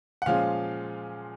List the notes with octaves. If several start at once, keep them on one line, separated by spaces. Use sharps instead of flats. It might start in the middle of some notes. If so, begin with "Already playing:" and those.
F#5
A#2 F3 G#3 C#4 F4 F5